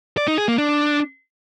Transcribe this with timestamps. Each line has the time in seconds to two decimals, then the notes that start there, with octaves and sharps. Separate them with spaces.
0.17 D5
0.28 D#4
0.38 G#4
0.48 A#3
0.58 D4